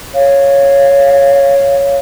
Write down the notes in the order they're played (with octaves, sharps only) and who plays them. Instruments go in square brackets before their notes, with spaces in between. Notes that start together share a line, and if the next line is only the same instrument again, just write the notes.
[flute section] C#5 F5